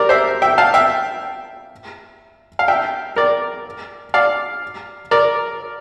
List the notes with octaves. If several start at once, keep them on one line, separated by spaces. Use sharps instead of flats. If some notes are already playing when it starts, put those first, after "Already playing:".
Already playing: G4 A#4 D5
C5 E5
E5 G5
F5 A5
E5 G5
F5
E5 G5
A#4 D5
D5 F5
A#4 D5